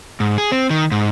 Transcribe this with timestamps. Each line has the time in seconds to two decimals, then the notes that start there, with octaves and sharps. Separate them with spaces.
0.20 G#2
0.38 G#4
0.52 C4
0.70 D#3
0.92 G#2